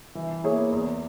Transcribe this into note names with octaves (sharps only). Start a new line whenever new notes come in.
E3
A#3 E4 G#4 C#5
E2